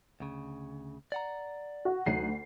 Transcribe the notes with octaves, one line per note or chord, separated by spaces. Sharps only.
D2 C#3
D5 F#5 A#5
F#4
D2 F#3 D#4 F#4 C7